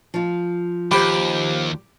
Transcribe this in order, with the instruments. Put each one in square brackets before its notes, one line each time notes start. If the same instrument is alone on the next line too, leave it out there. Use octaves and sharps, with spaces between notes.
[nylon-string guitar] F3 F4
[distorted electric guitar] D#2 [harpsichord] G4 [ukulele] C5 B5